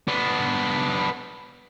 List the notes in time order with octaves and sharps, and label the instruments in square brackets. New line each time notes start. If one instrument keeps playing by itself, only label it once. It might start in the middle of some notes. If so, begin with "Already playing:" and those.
[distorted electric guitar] B3 D4